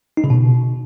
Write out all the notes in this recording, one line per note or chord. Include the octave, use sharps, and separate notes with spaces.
D#4
C#3
B2